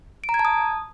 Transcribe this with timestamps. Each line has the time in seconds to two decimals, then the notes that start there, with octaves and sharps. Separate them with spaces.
0.24 D7
0.29 A#5
0.34 G#6
0.39 A5
0.45 D#6